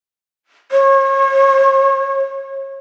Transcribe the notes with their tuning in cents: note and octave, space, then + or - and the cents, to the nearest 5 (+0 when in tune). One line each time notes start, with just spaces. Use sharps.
C#5 -35